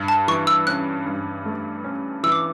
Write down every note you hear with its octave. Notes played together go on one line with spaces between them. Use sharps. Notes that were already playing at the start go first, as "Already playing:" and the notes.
Already playing: G2
A5
E3 C#6
E6
C#4 F#6
G2
A3
C#4
E3 E6
D6